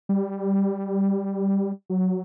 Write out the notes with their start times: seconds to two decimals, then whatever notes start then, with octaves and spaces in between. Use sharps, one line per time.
0.09 G3
1.90 F#3